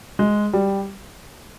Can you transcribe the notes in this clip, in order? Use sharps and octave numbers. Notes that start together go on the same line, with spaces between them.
G#3
G3